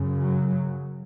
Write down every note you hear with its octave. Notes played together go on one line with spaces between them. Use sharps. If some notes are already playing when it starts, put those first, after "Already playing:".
Already playing: F#2 C#3
F#3